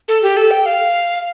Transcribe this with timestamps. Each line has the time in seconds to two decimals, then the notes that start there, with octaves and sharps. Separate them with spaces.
0.08 A4
0.23 G4
0.37 A4
0.51 G5
0.66 F5